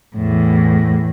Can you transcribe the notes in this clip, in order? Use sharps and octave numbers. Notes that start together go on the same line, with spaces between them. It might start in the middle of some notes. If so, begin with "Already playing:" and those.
E2 A2